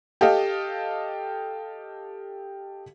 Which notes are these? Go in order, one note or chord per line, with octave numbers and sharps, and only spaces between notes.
G4 A4 D#5 F5